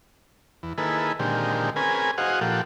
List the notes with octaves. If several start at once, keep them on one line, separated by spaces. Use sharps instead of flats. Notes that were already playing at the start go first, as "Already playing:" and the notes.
E2
D#3 A#3 E4 G#4 A4 B4
A#2 D3 D#3 G#3 C4 G4
C4 C#4 G#4 A#4 B4 G#5
F#4 G#4 C5 D#5 F5 F#5
A#2 F3 G4 A4 F#5